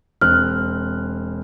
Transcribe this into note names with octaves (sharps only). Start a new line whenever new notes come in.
E1 C4 F6 F#6